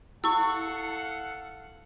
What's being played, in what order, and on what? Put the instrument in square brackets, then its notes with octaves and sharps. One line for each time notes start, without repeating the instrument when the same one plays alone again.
[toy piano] E4 [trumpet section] A4 F5 F#5 [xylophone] C#6 E6